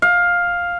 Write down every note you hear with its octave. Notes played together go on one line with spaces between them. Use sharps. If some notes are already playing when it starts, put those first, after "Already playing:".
F5